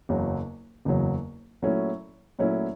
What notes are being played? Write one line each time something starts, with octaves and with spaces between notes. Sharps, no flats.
F#1 E2 C#3 F#3
F#1 E2 C#3 F#3
A#2 F#3 A3 C#4 E4
A#2 F#3 A3 C#4 E4